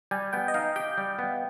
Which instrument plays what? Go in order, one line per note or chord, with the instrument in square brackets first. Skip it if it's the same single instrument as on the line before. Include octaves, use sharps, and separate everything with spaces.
[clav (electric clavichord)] G3 [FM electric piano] G#5
[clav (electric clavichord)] B3 [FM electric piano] G5
[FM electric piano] D#5
[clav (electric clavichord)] D#4 [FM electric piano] F5
[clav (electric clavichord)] G4 [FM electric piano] G5
[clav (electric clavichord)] G3
B3